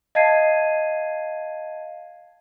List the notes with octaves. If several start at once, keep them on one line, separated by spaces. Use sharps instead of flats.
D#5 F5 A5 G#6 C7 D#7